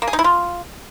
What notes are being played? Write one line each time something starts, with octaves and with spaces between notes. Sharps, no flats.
A#3
G#4
D#4
E4
F4